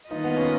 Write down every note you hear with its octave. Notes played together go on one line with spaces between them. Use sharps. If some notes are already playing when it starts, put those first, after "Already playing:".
D#3 A#3 D#4 F4 B4 D#5
B3
C#4